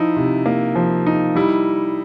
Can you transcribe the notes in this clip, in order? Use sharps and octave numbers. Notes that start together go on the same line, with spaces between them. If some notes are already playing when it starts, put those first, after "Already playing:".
Already playing: F3 D#4 E4
C3
A#3
F3
D#4
G3 E4